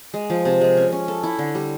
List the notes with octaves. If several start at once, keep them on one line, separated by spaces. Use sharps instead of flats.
G#3
F3
C3
G#3
C#4
C#4
A4
E4
D3
G3